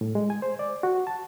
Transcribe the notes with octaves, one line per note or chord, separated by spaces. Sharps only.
A2
G#3
G#5
C5
D5
F#4
A5